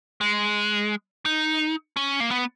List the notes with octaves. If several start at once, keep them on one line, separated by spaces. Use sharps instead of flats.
G#3
D#4
C#4
A#3
B3